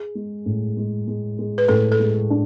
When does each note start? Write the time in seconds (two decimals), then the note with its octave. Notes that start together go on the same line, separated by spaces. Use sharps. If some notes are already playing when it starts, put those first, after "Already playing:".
Already playing: G#4
0.15 G#3
0.46 A2
0.77 G#3
1.07 G#3
1.39 G#3
1.58 B4
1.68 A2 A4
1.92 A4
2.00 G#3
2.30 D4